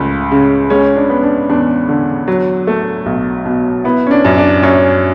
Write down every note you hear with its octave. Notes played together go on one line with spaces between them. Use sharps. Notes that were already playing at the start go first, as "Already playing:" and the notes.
Already playing: C#2 A3
C#3
G#3 C#4
D4
B3
D4
E2 D4
D3
F#3
A3
B1
B2
B3 E4
C#4
D4
F#2
D4
F#2 C#4